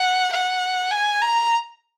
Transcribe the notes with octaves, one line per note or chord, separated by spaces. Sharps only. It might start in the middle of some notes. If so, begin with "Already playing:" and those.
Already playing: F#5
F#5
G#5
A#5